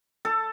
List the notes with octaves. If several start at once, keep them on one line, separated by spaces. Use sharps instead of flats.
A4